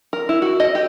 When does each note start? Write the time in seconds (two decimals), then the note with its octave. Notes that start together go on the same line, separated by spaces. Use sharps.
0.13 A#4
0.29 E4
0.42 F#4
0.60 D#5
0.75 G4